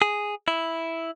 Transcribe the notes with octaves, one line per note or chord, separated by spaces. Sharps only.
G#4
E4